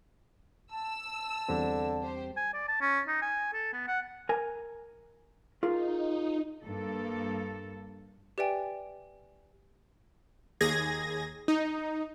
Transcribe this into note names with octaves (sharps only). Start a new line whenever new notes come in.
A5 E6
A5
E2 D3 G3 C4
G4 C5
G#5
D5
A5
C#4
D#4
G#5
A4
B3
F#5
A#4 G#5
D#4 F4 G#4 A#4
G2 A#3 A4
G4 B4 D5 E5 G5 G#5
D#2 G#4 G#6 A#6
D#4